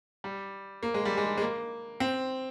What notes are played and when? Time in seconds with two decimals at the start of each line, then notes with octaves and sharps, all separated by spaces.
0.24 G3
0.83 A#3
0.94 G#3
1.05 G3
1.17 G#3
1.37 G#3
1.41 A#3
2.00 C4